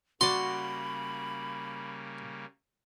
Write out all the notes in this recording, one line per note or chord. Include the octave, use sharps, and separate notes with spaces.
C#3 G3 A#3 F#4 D5 B5 C6